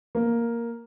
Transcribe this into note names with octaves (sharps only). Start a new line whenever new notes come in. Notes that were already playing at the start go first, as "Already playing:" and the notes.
A#3